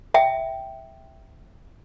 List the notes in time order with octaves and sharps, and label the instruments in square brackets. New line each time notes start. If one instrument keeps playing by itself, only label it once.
[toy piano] E5 G5